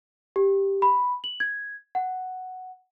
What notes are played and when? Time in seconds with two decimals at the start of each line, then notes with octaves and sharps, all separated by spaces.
0.36 G4
0.82 B5
1.24 F#7
1.40 G#6
1.95 F#5